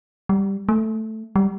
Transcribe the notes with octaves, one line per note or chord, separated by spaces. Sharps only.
G3
A3
G3